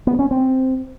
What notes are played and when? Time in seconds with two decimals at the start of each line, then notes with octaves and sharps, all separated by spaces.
0.07 B3
0.19 C#4
0.31 C4